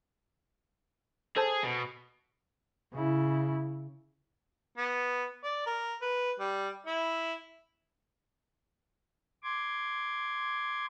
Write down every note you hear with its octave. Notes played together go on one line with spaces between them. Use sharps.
G#4 A4 C5 A5
B2
C#3 E4
B3
D5
A#4
B4
G3
E4
C6 D6 G#6